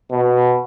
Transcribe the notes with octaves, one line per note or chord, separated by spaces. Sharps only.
B2